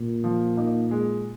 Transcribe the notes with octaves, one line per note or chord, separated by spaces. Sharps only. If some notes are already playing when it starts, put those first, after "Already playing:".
Already playing: A#2
F3
A#3 D#4
G#3